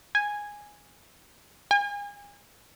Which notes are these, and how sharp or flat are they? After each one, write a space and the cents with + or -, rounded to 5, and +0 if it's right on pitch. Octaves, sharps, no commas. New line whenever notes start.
G#5 -5
G#5 -40